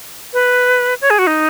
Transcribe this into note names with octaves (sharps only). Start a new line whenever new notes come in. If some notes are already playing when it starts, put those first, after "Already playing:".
B4
C#5
G#4
F#4
D#4